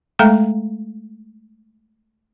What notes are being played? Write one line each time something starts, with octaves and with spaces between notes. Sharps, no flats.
G#3 A3 A4 F5 G5 A#5